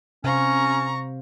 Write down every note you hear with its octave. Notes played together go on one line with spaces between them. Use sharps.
C3 C#4 C5 F5 A#5 C#6